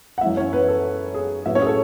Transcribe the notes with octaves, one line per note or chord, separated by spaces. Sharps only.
F#5
F#2 E3 G#3 E4 E5
C#4 C#5
B3 B4
A4
G#4
A2 F#3 B3 E4 E5
C#4 C#5
G#4
A4